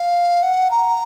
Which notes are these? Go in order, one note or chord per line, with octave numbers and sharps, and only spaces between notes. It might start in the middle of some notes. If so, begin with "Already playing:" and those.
Already playing: F5
F#5
A#5